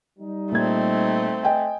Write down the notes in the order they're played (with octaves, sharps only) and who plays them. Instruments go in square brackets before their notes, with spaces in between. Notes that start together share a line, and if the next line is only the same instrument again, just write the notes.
[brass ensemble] G3 D#4
[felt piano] A#2 G#6 [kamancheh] A3 C4
[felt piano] D#5 G5 G#5